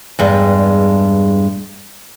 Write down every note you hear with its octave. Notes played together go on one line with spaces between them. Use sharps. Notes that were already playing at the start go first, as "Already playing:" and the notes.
E2 G2 G#3